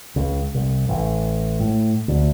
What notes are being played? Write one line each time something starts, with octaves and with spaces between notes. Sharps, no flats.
C#2
C2
A1
A2
D2